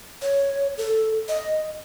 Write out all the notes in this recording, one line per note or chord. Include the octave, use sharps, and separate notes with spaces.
C#5
A4
D#5